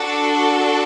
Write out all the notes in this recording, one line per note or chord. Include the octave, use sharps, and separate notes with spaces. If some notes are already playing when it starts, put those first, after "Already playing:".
Already playing: D4 F#4 A4